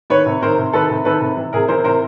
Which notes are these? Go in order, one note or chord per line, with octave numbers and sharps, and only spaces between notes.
D#3 B4 C#5
C3
D#3 A#4 C5
C3
D#3 A4 B4
C3
D#3 A4 B4
C3
E3
C3 G#4 A#4
E3 A#4 C5
C3 A#4 C5